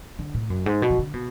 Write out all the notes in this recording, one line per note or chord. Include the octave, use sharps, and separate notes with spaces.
D3
A2
F#2
G#2
B2
E3
D3
B2